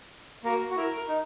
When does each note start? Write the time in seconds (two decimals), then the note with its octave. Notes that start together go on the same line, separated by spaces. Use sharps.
0.44 A#3 F#4 A#4
0.71 F#4
0.77 E4 A#4
1.08 D#4